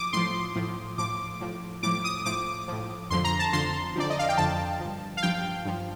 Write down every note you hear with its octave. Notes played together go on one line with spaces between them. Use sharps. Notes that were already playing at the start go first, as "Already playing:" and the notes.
Already playing: F3 D6 D#6
A2 F3 C6
A2 F3
A2 F3 D6
A2 F3
A2 F3 D6
D#6
A2 F3 D6
A2 F3
F2 D3 F3 C6
A#5
A5
F2 D3 F3 C6
F2 D3 F3 D5
D#5
F5
G5
F2 D3 F3 A5
G2 F3
F5
G2 F3 G5
G2 F3